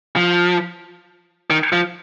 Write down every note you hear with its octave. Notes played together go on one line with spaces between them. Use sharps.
F3
D#3
F3